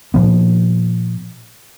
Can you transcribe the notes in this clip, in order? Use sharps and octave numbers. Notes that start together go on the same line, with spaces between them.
A#2 F3 B3